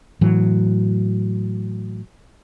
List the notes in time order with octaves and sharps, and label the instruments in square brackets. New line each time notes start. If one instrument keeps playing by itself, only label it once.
[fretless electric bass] A2 E3 F#3